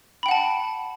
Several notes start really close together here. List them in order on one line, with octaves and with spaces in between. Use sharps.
B5 G5 F#5 A5